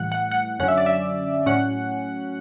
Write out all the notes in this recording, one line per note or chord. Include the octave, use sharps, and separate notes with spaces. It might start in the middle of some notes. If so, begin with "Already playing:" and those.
Already playing: A2 E3 G3 F#5
F#5
F#5
F#2 D3 F#3 C#4 F#5
E5
D5
E5
A2 F#3 C#4 F#5